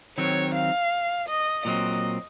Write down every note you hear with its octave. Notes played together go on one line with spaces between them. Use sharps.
D#3 F#3 C4 C#5
F5
D#5
A#2 F#3 C4 D#5